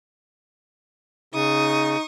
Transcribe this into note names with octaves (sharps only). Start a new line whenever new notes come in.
C#3 D#4 C#6 D#6